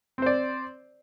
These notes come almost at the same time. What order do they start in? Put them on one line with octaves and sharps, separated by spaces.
C4 C5 D5